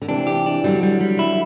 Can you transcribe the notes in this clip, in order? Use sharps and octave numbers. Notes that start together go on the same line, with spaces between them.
D3
C3 E3 D4
G4
D4
D3 F#3 G3
G3
G3
E4